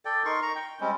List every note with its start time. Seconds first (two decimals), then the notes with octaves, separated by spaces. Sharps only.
0.05 A4 D5 G5
0.25 D#4 A#4 C6 C#6
0.42 A#5 C#6
0.56 G5
0.80 G3 G#3 C4 C#4